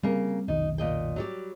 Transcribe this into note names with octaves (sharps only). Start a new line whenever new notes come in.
C#3 G3 A#3 C4
F1 B1 D#3 D#4
A#2 D#5 G5
F#3 G3 G4